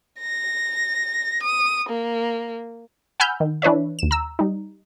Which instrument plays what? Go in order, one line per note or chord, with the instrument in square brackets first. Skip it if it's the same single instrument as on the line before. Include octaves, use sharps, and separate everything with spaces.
[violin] A#6
D#6
A#3
[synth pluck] F#5 G#5 B5 E6 F6 G6
D#3
E3 D4 B4 C#5 E5
D#2 E7
A#5 E6
G3 D#4